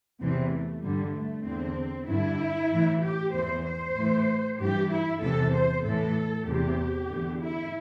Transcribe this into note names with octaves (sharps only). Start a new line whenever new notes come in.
E2 C3 E3 C4
A3
G2 D3 G3
A3
E2 D3 C4
G2 D3 E4
A2 E3
G4
E2 E3 C5
C5
A2 E3
G2 E3 G4
E4
E2 C3 E3 A4
C5
A2 A4
E3
E2 C3 E3 G4
E2 D3
E4